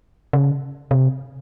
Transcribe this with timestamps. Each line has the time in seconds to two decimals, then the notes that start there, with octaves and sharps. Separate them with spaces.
0.33 C#3
0.91 C3